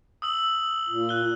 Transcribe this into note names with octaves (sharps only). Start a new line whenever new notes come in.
D#6 E6 F#7
A#2
F#6 G7